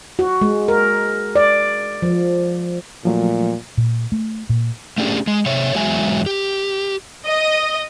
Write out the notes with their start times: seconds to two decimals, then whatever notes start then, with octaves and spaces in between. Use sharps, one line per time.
0.19 F#4
0.41 G#3
0.68 A#4
1.36 D5
2.02 F3
3.05 A#2 F3 F#3 A3
3.77 A#2
4.12 A3
4.49 A#2
4.98 A3 C#4 D4 G4 G#4
5.27 G#3
5.46 C3 C#5 E5
5.75 E2 F#3 G#3 E5 G#5
6.26 G4
7.26 D#5